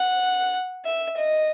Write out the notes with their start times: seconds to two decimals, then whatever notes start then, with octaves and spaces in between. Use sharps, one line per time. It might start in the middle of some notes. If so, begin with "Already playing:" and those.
Already playing: F#5
0.85 E5
1.17 D#5